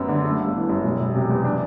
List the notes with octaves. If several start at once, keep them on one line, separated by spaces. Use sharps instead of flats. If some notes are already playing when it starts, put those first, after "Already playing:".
Already playing: F#2 F#3 B3
D3
A3
G1
E3
F#2
E1
E1
C3
E2
D4